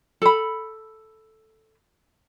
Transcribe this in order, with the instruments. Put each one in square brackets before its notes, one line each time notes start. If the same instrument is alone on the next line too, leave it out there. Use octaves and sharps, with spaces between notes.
[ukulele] A4 B5